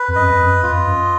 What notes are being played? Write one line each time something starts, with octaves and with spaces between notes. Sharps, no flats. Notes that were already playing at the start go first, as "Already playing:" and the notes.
Already playing: B4
F2
F#2 D#5
F2
F#2
F2 F4
F#2